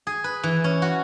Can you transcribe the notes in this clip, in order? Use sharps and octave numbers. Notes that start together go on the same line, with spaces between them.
G#4
B4
E3
C#4
F#4